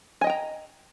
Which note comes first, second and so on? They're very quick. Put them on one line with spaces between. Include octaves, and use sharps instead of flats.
G#5 D#5 G5 A#5